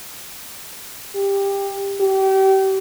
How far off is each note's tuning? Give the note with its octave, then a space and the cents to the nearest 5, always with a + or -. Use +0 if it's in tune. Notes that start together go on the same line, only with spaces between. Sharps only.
G4 +15
G4 -30